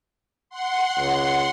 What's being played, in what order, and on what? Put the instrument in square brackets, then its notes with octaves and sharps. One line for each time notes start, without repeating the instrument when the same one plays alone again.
[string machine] F#5 C6
[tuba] C#2